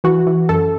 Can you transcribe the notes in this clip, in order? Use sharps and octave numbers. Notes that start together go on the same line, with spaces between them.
E3 F#4
E3
F#2 A4